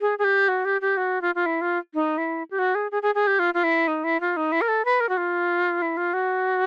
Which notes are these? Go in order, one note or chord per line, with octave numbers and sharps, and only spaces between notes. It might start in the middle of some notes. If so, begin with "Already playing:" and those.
G#4
G#4
G4
F#4
G4
G4
F#4
F4
F4
E4
F4
D#4
E4
G4
F#4
G#4
G#4
G#4
G#4
G4
F4
F4
E4
D#4
E4
F4
D#4
E4
A#4
A4
B4
A#4
F#4
F4
E4
F4
F#4